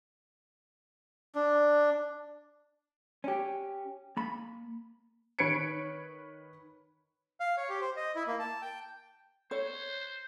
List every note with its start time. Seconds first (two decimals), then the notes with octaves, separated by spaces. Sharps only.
1.35 D4
3.24 C#4 G4
4.17 A#3 B5
5.39 D#3 B4 C#5 G#6 C#7 D7
7.40 F5
7.57 C#5
7.69 G4
7.81 C5
7.96 D#5
8.15 E4
8.27 A#3
8.39 A5
8.62 G5
9.51 C5 C#5